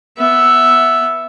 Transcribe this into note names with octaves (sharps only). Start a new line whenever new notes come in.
B3 E5